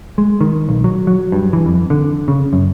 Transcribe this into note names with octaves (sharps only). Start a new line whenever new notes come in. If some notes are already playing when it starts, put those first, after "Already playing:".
G#3
D#3
B1
F#3
F#3
G2
E3
F2
D3
C#3
F#2